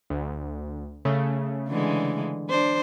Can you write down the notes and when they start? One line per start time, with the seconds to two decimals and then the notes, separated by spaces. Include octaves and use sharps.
0.10 D2
1.05 C#3 A3
1.68 D3 E3 G#3
2.49 D4 C5